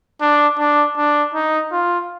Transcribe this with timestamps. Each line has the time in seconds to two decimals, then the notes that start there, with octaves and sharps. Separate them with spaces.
0.21 D4
0.59 D4
0.97 D4
1.35 D#4
1.72 F4